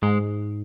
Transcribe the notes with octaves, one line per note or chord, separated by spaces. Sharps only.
G#2 G#3